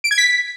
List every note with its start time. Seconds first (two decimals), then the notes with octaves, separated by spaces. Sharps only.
0.04 D7
0.11 G#6
0.18 B6